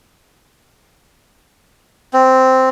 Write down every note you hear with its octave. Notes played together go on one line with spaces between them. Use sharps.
C4